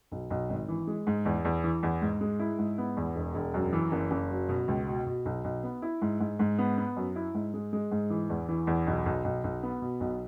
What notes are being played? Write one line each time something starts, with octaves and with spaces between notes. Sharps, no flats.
B1
B1
G#1
E3
G#3
G#2
E2
E2
E3
E2
G#2
G#3
E4
G#2
B3
E2
E1
E1
F#2
E3
F#1
F#1
F#3
B2
C#2
B2
B2
B1
B1
B3
E4
G#2
G#2
G#2
B3
B3
F#2
E4
G#2
G#3
G#3
G#2
E3
E2
E3
E2
B1
B1
B1
B1
B3
B2
B1